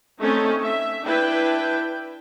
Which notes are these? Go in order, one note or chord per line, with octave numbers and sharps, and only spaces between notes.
A3 C4 C#4 D#4 A4
E5
D4 E4 B4 G5